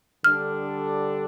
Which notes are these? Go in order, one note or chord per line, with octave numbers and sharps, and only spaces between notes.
D3 G3 D4 A4 F6